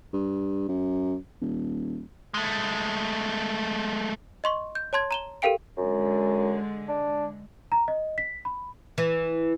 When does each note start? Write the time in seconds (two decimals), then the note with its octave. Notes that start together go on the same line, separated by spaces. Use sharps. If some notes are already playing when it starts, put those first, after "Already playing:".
0.13 G2
0.69 F#2
1.41 D#1
2.34 G#3 A3
4.44 D#5 C6 C#6
4.75 G6
4.93 C#5 A5 C6 G#6
5.11 A#5 E7 G7
5.42 G4 A4 A#4 F5 G5 D7
5.77 F#2 D3 G#3
6.88 D4
7.72 A#5
7.88 D#5
8.18 B6
8.45 B5
8.98 E3